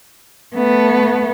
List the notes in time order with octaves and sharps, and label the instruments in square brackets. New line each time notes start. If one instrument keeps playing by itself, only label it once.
[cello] A3 B3